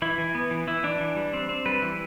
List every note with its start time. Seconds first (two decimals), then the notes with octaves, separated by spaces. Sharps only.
0.02 E3 E4
0.18 E3
0.35 B3
0.51 E3
0.68 E3 E4
0.84 E3 D4
1.00 E3
1.16 G3
1.33 C4
1.49 C4
1.66 G3 B4
1.82 E3